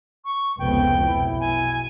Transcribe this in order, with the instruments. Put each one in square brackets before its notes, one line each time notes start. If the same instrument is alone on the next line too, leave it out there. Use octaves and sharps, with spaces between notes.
[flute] C#6
[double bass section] F1 C#2 B3 [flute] G5
[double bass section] B1 [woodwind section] E4
[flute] G#5